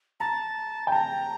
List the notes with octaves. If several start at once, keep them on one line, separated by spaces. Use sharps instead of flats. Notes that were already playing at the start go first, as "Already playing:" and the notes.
A5 A#5
G5
A5 A#5